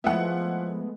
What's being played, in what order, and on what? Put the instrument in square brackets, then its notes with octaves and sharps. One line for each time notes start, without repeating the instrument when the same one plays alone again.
[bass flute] F3 [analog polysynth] G#3 A3 B3 [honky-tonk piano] E4 F#5